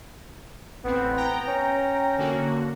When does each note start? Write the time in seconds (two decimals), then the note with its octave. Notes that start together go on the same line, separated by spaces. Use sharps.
0.84 A1 B3 C4
1.17 G5 A#5
1.48 C#4
2.18 D3 A#3 F#4